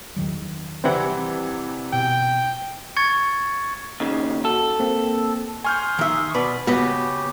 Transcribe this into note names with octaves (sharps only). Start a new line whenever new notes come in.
E2 D#3 F#3
C3 E3 G3 C4 E4 F#5
B2 G5
C#6 G#6 A6 C#7
D#2 C#3 D#4
F#4 A4
A#3 C4
G#5 C6 C#6 D#6 F6 G6
D#3 E5
B2 B4 D5
C#3 B3 F#4 G4 B4 D#5